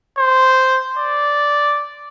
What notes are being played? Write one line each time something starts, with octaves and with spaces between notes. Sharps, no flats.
C5
D5